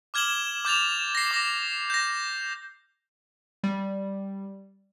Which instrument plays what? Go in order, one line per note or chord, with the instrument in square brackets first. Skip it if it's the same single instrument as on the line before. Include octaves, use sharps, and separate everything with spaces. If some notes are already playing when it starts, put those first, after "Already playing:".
[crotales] D6 F6 G#6 E7 F#7 G7
D6 G6 A6 F7
A#6 C7
D6 A#6
G6 A#6
[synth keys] G3